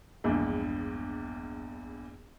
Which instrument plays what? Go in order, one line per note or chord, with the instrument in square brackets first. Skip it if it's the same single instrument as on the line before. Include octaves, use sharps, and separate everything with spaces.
[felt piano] A#1 E2 G2 G#3